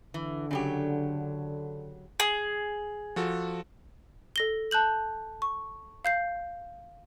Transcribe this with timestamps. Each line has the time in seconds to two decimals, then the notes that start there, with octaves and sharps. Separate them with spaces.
0.14 D3 E3
0.51 C#3 F#3 G4
2.20 G#4
3.16 F3 F#4 A4
4.36 A4 A#6 G7
4.71 A5 F#6 G6 F#7
5.42 C#6
6.05 F5 G6 C7